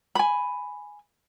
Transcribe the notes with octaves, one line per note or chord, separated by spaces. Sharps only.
G#5 B5